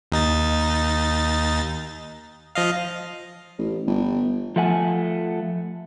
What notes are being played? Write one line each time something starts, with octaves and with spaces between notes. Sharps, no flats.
D#2 D#4 A6
F3 D#5 F5
A1
G1
F3 A3 F#5 G#5